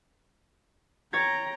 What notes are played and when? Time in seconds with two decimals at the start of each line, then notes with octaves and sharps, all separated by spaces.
1.13 C#5 G5 A#5 G#6 A6